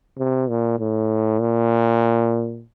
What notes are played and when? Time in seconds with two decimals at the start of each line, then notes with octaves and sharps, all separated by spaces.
0.18 C3
0.49 A#2
0.79 A2
1.41 A#2